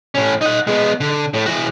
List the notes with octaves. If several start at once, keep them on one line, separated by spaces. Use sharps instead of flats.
A2 C#4
D#4 F#5
G#3 B3
D3
A2
E3 F#4